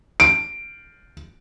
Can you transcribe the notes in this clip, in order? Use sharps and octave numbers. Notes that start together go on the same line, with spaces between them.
D7